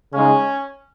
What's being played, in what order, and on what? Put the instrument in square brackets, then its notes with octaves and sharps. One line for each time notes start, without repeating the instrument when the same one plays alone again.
[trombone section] C#3 G#3 D#4 [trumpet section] C#4